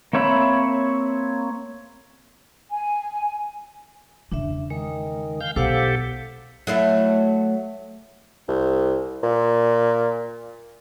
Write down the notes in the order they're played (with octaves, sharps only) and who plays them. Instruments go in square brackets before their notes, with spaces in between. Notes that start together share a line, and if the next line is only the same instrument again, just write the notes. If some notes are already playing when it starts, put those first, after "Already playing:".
[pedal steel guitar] A#3 C4 C#5 E5 B5
[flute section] G#5
[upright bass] E2 C#3 [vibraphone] D4 E5
[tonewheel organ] D#3 [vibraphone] G#3
[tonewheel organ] F5 G6
[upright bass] B1 [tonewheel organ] G4 A4 [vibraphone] C5 F5 F#5
[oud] F#3 A3 E4
[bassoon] C2
A#2